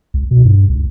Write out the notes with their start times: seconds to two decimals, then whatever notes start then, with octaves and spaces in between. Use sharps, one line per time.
0.14 C#2
0.31 B2
0.45 G2
0.70 C#2